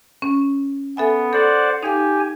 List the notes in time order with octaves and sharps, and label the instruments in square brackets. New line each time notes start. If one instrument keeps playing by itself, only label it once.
[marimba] C#4
[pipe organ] B3 [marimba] A4 E5 G#5
[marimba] A4 [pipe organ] C5 D5 F#5
[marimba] D#4 F5 [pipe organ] G4 G#5